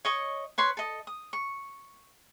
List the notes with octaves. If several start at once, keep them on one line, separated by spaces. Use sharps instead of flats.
C#5 D#5 C#6
B4 C#5 C6
A4 D#5
D#6
C#6